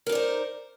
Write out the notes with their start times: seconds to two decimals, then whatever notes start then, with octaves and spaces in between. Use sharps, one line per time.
0.07 A#4
0.09 D#4
0.12 D5
0.15 C5